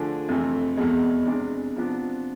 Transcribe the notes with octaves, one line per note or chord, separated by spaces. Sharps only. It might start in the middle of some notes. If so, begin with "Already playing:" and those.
Already playing: D3 F3 A3 D4 G#4
F2 C3 E3 A3
E2 B2 G#3
C3 G#3 D4
C3 F3 B3 D4